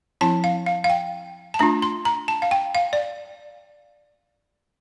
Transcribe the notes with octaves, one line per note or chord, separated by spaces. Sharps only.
F3 C4 E4 A5
F5
F5
F5
G5
A5
A3 D4 F4 A#5
C6
A#5
A5
F5
G5
F5
D5